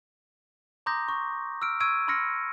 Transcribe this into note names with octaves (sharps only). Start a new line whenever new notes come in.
A#5 C6 D6 D#6 G6 A#6
C#6
E6 F6 D7
C#6 E6 G#6 D7 D#7
B5 C6 E6 F6 A#6 C#7